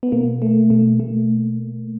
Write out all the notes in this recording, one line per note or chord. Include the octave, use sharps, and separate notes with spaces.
B3
B2 A#3
B2 A3
B2 A3
B2 A3